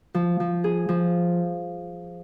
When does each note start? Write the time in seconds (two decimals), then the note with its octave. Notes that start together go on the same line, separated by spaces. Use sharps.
0.14 F3
0.40 F3
0.64 G#4
0.89 F3